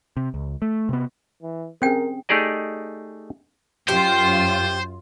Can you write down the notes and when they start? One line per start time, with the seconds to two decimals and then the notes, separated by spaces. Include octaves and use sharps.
0.17 C3
0.34 C#2
0.62 A3
0.89 C3 B3
1.43 E3
1.82 C4 C#4 G#4 A#4 G5
2.29 A3 D#4 G4 G#4 D5 D#5
3.88 F#2 F4 G4 C5